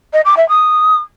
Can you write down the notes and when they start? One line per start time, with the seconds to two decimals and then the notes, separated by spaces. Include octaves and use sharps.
0.13 D#5
0.25 D6
0.37 E5
0.49 D#6